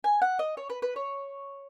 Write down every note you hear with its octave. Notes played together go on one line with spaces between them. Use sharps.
G#5
F#5
D#5
C#5
B4
B4
C#5